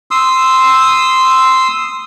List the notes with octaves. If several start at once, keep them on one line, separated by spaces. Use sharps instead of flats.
C6 D#6 E6